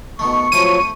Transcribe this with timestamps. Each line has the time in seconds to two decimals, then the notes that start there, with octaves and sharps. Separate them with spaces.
0.19 B2 D#3 A3 C#6
0.52 F3 F#3 A3 C4 E4 D#7